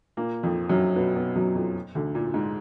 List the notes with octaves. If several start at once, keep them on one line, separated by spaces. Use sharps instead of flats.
A#2 A#3
F2 F3
F#2 F#3
B2 B3
B2 B3
F#2 F#3
F2 F3
D2 D3
A#2
G#2